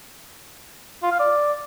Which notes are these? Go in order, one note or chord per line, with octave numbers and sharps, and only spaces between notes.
F4
F5
D5